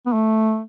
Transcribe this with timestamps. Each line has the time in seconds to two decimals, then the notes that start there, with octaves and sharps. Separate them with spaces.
0.06 B3
0.13 A3